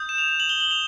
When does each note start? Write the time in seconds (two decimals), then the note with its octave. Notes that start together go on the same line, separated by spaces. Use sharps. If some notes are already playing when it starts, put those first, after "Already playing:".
Already playing: D#6 G6
0.09 E7
0.18 F7
0.29 F7
0.40 F#7
0.49 G7
0.60 F#7
0.71 F7